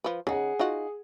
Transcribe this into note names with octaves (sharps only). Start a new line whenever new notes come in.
F3 B4
C#3 D#4 G#4 F#5
D#4 F4 F#4